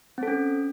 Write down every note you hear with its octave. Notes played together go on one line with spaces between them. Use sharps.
C4 C#4 A4